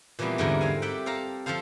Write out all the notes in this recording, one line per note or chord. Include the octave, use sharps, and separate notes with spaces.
A#2 E3 F3 G3 B3 C4
E2 G#2 D3 G3 E4 A#4
C4 F5 G#5
G4 D5 E5 F#5 G5
A4 C5 F5 A#5
F3 F4 A4 C5 F5